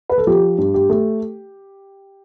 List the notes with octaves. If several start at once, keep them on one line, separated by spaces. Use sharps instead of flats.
B4
A4
F3 G4
G2
G4
A3